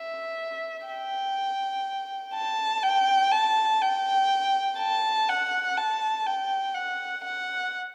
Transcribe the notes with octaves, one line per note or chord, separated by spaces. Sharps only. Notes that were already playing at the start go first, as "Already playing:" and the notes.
Already playing: E5
G5
A5
G5
A5
G5
A5
F#5
A5
G5
F#5
F#5